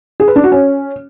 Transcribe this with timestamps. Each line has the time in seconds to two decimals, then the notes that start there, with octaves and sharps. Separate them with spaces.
0.20 G#4
0.28 B4
0.36 D4
0.44 F#4
0.52 C#4